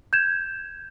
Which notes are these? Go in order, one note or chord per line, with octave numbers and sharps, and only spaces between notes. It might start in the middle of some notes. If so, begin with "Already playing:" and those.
G6 G#6 E7